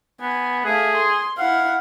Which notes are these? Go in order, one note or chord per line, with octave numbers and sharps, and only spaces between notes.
B3 G#5
A3 G#4 F5
C6
E4 F5 F#5